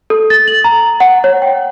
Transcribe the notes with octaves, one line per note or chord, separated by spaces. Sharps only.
A4
A6
F#7
A#5
F#5
C#5
G5